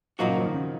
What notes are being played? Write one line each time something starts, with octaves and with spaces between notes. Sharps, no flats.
A#2 F3 F#3 A#3 D#4 F#4
C#3
F3
D#3
C#3